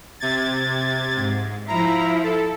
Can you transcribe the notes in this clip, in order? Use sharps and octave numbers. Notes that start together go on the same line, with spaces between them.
C3 G#6 A6
G#2
F3 E4 A#5
A4